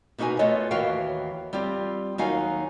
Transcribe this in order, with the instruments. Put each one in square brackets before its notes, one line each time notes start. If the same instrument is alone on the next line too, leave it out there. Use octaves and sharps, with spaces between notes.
[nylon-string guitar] B2 A#3 D#4 F#4 B4 G#5
A3 F4 B4 C#5 D#5
D#2 E3 F#4 C#5 F5 G5
G3 C4 F4 G4
D#2 F#3 D#4 F#4 F5 G#5